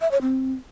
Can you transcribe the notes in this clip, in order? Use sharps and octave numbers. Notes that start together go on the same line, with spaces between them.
E5
C#5
C4